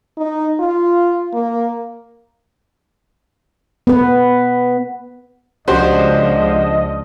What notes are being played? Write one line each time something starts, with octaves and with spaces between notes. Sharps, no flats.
D#4
F4
A#3
B3 B4
C#2 F3 D4 F#4 G4 C5 D#5